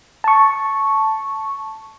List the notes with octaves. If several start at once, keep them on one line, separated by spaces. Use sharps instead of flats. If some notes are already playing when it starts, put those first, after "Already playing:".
A5 C#6